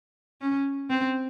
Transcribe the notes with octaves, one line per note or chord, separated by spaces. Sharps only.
C#4
C4